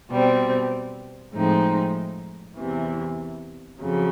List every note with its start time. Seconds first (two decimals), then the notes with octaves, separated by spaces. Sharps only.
0.08 B2 G3 C4
1.32 A2 F3 G#3 C4 D#4
2.56 E2 C3 E3
3.80 F2 C#3 F#3